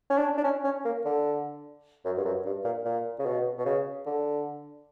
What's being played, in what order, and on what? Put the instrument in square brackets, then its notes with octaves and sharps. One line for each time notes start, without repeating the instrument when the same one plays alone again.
[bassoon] C#4
D4
D4
C#4
C#4
A#3
D3
F#2
G2
F#2
G2
A#2
A#2
C#3
B2
B2
C#3
D3